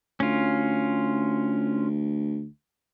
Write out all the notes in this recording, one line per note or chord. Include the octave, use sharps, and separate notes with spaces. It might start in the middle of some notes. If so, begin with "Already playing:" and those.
D2 C#4 F4